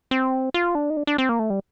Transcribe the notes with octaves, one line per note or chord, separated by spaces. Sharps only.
C4
F4
D4
D#4
D4
D4
C4
A#3
A3
G3